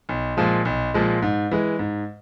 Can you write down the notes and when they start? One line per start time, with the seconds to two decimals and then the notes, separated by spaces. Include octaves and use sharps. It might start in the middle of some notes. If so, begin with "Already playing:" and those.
0.09 B1
0.37 A#2 F3 G#3
0.65 B1
0.94 A#2 F3 G#3
1.22 G#2
1.51 E3 G#3
1.79 G#2